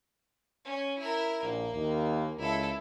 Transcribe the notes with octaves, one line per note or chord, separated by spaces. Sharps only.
C#4
E4 A#4
A#1 A#3
D#2
C#2 E4 A4